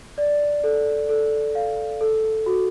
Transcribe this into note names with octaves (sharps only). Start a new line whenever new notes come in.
D5
A4
A4
F5
A4
F#4